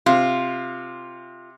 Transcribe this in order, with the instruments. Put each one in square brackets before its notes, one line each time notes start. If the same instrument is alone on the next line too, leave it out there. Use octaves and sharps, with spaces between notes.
[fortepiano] C3 [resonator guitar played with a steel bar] F4